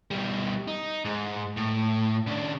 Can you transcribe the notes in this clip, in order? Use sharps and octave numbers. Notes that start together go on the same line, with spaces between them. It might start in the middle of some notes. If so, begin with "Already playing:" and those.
B2 G3
D#4
G#2
A2
C#3 D4